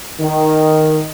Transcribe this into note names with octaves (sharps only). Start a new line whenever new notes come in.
D#3